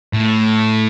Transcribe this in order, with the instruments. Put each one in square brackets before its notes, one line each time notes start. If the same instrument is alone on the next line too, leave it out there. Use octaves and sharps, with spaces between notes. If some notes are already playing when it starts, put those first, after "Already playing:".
[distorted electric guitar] A2